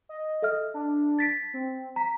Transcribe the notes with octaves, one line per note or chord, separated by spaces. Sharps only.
D#5
A4 E5 F6
D4
A6 B6 D7
C4
A#5 B6